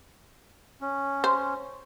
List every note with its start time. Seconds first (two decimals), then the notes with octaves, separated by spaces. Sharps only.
0.81 C#4
1.24 C5